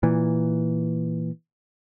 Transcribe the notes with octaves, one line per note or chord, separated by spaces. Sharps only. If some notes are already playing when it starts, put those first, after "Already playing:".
A#2 E3